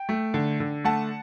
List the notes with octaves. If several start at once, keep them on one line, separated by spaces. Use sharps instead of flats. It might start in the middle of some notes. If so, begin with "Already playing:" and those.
Already playing: G5
A3
D3
D3
A3 F#5 A5